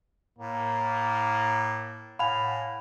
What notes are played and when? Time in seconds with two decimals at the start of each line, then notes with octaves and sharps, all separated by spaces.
0.39 A2 A#3
2.19 A2 F5 F#5 G#5 B5 F7